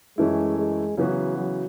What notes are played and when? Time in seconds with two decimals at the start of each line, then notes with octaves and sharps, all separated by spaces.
0.18 F#2 E3 G#3 A3 C#4 E4
0.58 G#3
0.97 C#3 E3 F#3 B3 F#4
1.37 F#3